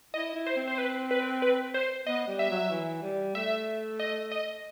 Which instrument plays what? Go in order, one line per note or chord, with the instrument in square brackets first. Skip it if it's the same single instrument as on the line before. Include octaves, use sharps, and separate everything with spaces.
[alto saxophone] E4 [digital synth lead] D#5
[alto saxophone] E4
[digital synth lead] C5
[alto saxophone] C4
[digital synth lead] C5
B4
B4
B4
C5
[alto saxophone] B3 [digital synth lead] D#5
[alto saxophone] G3
[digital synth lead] E5
[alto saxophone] F#3
E3
G3
[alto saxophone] A3 [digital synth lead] E5
[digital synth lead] D#5
D#5